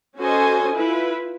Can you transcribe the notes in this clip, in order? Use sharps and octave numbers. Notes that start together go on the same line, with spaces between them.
C#4 F#4 A4 C5 D#5 G#5
E4 F4 B4